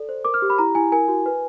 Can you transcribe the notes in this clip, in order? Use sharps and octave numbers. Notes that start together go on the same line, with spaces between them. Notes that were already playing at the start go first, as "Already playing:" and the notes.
Already playing: A4 D5
C5
A#4 D6
F6
G4
B5
E4 A#5
E4 G#5
A#4 G#5
F#4
B4